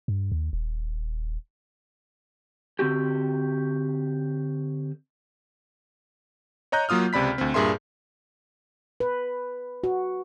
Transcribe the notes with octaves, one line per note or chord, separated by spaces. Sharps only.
G2
D#2
D#1
D3 C4 F#4 G4
C#5 D#5 A#5 F#6 G6
F#3 A#3 F4 D#6 F6
C#2 C3 D5 B5 B6
D2 C4
G2 A#2 G#4 A#4 E5 C6
B4
F#4